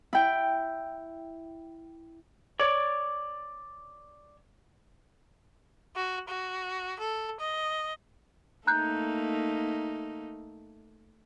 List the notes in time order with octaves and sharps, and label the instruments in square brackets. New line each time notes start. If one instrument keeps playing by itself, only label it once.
[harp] E4 G5
[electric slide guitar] C#5 D5
[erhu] F#4
F#4
A4
D#5
[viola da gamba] A3 A#3 D#4 [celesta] A#5 F#6 G6